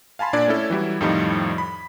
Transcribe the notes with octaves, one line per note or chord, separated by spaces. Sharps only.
F5 G#5 A5 B5 C6
A#2 D4 D5 G#6
A3 C#4 E4 A4
E3 F#3 G3 E4
F2 A2 D#3 F3 G3 D#4
B5